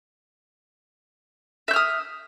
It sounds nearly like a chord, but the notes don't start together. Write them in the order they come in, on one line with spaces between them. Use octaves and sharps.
E5 G6 F6 D#6